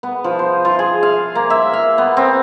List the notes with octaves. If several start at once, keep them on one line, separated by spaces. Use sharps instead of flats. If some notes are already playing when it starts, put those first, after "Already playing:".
B3
F3
C5
F4
G#4
F5
A#3
E5
F5
B3
C4